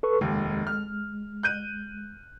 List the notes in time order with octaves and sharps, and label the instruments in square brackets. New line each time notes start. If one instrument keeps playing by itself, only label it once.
[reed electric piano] A4 B4 C#6
[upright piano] F1 D#2 [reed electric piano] G#3
[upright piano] F6
F#6 G6 D#7